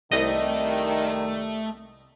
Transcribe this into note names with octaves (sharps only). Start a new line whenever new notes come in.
C2 D#3 G3 A3 D#5